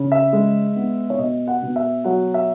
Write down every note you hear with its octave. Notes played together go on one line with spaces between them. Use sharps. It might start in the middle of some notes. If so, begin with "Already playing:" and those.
Already playing: C#3
E5
G#3
B3
C#5
B2 D#5
F#5
B2
E5
F#3 F#5
E5